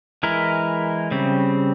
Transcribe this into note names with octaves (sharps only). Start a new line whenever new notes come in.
E3 G#3 E4 A#4
C#3 G3 C4